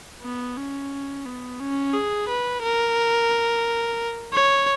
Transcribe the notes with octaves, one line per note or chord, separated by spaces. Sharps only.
B3
C#4
B3
C#4
G#4
B4
A#4
C#5